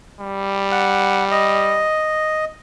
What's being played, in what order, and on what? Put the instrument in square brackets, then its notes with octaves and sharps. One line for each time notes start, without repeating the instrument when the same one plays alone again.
[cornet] G3
[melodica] F#5
D#5